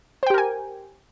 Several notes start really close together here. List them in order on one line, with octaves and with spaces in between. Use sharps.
C5 G5 G4 A#4 G#5